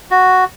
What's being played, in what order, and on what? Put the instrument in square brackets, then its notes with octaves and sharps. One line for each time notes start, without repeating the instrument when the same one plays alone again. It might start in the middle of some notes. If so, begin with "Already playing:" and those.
[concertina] F#4